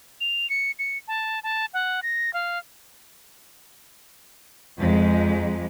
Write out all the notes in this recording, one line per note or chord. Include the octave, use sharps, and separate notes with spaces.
F7
C#7
C#7
A5
A5
F#5
A#6
F5
F2 G#3